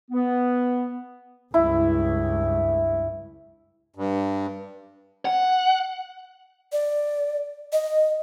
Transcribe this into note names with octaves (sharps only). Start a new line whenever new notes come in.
B3
C#2 G2 E4
G2
F#5
D5
D#5